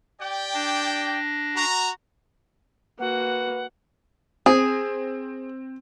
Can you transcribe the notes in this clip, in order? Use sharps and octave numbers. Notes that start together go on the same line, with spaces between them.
G4 D5 G5
D4 A#6
F#4 A#5
A#3 F#4 B4 F#5
C4 G#4